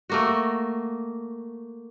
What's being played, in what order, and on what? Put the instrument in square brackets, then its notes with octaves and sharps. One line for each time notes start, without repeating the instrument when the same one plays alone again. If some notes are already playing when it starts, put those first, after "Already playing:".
[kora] A3 A#3 F#4